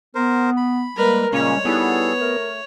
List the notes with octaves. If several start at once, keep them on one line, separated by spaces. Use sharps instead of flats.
B3 A#4 C5
B5
G3 G#3 A#3 A#4 B4
A#2 C#3 G3 G#3 A#3 C#4 C#5
G3 B3 D#4 E4 G#4 A4
A3 A#4